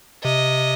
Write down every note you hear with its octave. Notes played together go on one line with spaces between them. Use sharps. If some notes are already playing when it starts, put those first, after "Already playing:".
C3 D#5